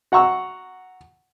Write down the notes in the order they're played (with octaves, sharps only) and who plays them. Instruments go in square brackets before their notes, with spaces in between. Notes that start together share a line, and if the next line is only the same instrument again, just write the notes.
[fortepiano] F#4 F#5 A#5 C#6 E6